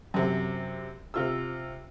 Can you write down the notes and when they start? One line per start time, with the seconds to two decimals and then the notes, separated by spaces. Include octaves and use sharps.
0.14 F#2 C3
1.14 C3 F4 E6